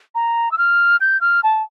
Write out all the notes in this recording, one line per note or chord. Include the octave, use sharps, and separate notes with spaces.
A#5
E6
F6
G6
F6
A5